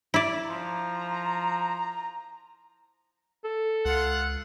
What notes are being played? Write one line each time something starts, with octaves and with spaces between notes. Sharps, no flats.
E4 D5
F3 A#5
A4
C#2 F4 F#5